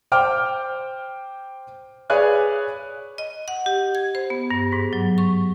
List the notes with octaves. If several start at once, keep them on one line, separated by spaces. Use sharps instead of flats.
C5 G5 D6 F6
G#4 B4 C#5 D5 G#5 F#6
D#5
F#5
G4
G#6
C5
B3
G2
G#2
F#3
C#6